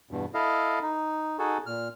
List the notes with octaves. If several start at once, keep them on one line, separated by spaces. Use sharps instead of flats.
E2 G2 B2
E4 A4 D#5 F5
D#4
D#4 F#4 G#4 A4
A#2 F6